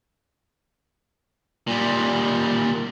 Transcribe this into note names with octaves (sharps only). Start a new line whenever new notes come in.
A#2 G3